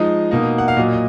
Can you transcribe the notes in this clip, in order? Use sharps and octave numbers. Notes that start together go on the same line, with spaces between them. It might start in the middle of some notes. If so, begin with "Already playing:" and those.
Already playing: F3 G#3 D#4 D#5
B2 A#3 D#4
F#5
F5
A#2 F#3 A#3 D#5
D#5